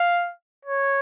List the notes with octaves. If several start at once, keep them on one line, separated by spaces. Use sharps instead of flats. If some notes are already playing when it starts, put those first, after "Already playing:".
Already playing: F5
C#5